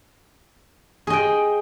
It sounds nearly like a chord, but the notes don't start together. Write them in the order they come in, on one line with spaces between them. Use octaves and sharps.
G#4 D#5 G5